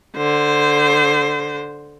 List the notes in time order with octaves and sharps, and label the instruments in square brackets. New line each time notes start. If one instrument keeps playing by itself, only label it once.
[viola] D3 C5